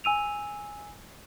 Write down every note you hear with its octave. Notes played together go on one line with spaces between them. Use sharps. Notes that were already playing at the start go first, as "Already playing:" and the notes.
G#5 E6 D#7 F7